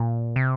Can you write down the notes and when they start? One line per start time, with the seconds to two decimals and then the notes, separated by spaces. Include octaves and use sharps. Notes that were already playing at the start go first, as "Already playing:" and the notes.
Already playing: A#2
0.36 C3